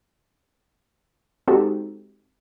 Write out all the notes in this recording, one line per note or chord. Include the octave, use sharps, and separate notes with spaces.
G#3 C4 D#4 F#4 G4 A4